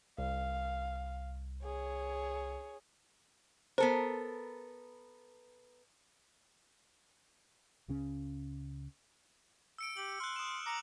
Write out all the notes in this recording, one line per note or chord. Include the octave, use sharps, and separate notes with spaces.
C2 F5
G#4 C#5
B3 A4 A#4 C5
C#2 C#3 C#4
E6 C#7 D7
G4 F#7
C6 F6 F#6
D#6 E7
A#5 D6 C#7 F7